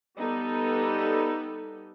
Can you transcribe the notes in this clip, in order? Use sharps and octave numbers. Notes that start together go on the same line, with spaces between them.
G3 B3 D#4 A4